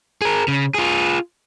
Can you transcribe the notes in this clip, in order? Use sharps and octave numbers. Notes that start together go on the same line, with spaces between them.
G#4 A#4
C#3
F4 G#4